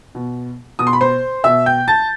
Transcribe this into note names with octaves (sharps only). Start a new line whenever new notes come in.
B2
B2 D#6
C6
B5
C5 C6
B2 E5 E6
G5 G6
A5 A6